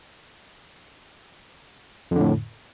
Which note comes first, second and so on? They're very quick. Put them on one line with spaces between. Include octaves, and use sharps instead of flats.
F2 D3 A2